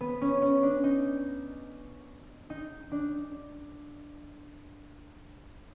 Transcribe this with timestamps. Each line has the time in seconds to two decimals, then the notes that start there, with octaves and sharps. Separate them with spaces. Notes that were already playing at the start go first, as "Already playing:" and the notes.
0.01 B3
0.21 C#4
0.42 C#4
0.63 D4
0.84 D#4
2.50 D#4
2.92 D4